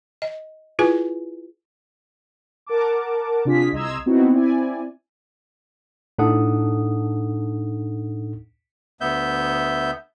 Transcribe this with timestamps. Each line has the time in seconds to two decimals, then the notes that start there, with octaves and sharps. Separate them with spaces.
0.22 D#5
0.79 E4 F4 G#4 B4 G#5
2.66 A#4 F#5 A5 D6
3.45 C3 D4 F4 G#4 B6
3.72 C2 D#5 A#5 C6 E6 G#6
4.06 B3 C4 D#4 E4 F#4
4.32 C4 E4 D5 G#5
6.18 A2 D4 D#4 A4 F#5 D#6
9.01 D2 B3 E5 G6